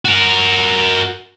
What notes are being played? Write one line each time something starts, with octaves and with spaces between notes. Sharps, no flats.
F#4 A#4